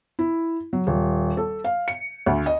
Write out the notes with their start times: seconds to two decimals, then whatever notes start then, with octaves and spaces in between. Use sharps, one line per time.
0.19 E4
0.73 F#3
0.87 D#1
1.37 A4
1.64 F5
1.88 C#7
2.26 D2
2.46 D#5